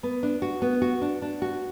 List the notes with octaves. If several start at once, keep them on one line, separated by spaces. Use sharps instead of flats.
B3
D4
F#4
B3
F#4
D4
D4
F#4